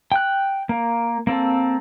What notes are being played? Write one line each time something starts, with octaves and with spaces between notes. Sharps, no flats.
G5 F#6
A#3
A#3 C4 A4